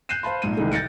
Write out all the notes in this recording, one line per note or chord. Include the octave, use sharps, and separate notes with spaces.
F#6 G6 C7 D#7 E7
C5 F5 A5 B5 C6
A#1 G#2 D#7
C2 D#3 E3 G#3 A3
G6 A6 A#6 C#7 D7